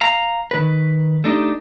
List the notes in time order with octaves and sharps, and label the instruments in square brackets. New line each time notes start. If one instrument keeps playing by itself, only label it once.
[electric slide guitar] F5 A#5
D#3 B4
A3 D4 D#4 G4